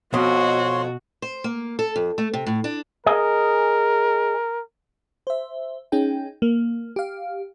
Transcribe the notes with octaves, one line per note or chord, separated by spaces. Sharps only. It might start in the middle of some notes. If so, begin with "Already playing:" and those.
F2 B2 F#4 C#5 C6
C5
A#3
A4
F2
A3
C3
A2
D4
G#4 A#4 D#5
C5 E5
C#4 D#4 G#4 G5
A#3
G4 F5